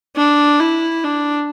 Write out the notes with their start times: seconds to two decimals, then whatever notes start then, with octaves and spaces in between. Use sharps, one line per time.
0.17 D4
0.60 E4
1.04 D4